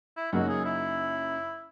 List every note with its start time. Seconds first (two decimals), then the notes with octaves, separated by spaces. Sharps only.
0.17 E4
0.33 F#2 C#3 F#3 A#3 D#4 F#4
0.49 G#4
0.65 E4